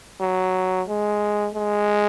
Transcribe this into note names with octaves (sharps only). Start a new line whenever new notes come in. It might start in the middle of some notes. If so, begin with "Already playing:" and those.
F#3
G#3
G#3